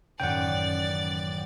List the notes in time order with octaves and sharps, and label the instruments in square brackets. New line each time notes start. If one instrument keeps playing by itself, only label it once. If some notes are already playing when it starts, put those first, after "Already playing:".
[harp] A1 F#2 D#3 [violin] D5 A6 [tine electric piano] F#5 G5